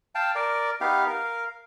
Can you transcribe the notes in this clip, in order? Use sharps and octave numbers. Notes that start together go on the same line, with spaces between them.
F5 G5 A5
A#4 D5
B3 D#4 G4 F5
A#4 F5